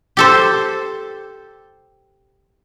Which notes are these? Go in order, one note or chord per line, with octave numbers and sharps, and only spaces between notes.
G4 A4 C5